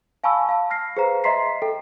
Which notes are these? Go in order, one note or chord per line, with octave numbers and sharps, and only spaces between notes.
F5 G#5 A5 B5 C#6 E6
F5 A5
F6 A#6 C7
G#4 B4 C5 F5 A#5
D#5 E5 A#5 C6 B6 C7
A4 G5